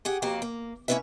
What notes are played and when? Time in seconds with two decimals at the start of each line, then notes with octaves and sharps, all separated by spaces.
0.05 G4 G#4 F#5
0.22 F2 A#3 F#4 G4 F5
0.42 A#3
0.88 A#3 C#4 D4 E4 B4 E5